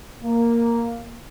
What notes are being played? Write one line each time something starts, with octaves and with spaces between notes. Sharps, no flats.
A#3